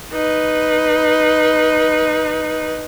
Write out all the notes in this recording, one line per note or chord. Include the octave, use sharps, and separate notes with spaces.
D#4 B4